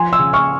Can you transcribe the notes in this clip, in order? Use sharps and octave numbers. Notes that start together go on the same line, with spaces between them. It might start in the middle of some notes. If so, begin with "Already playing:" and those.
Already playing: F3 G#5 C6
C6 E6
C#3
C#6 F6